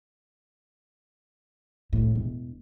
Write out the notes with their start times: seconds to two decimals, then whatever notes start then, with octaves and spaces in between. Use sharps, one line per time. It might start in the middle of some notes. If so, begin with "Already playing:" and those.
1.93 A2
2.15 E1